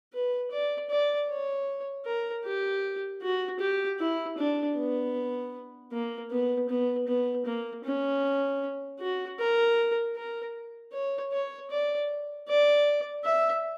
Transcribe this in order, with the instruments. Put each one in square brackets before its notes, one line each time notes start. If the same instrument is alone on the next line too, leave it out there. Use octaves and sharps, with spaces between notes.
[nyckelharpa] B4
D5
D5
C#5
A#4
G4
F#4
G4
E4
D4
B3
A#3
B3
B3
B3
A#3
C#4
F#4
A#4
A#4
C#5
C#5
D5
D5
E5